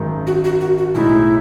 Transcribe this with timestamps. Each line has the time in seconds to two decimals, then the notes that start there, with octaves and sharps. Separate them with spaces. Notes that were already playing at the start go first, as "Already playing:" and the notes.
Already playing: G#1 F#2 D#3 G#3 D#4
0.27 F#4
0.44 F#4
0.61 F#4
0.78 F#4
0.94 B1 A2 G#3 D#4 E4